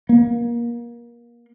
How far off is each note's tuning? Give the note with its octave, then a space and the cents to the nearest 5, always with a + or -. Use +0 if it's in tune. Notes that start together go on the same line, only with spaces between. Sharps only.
A#3 +25